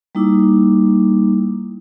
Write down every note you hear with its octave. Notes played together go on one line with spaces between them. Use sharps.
G3 A#3 D#4 E4 D6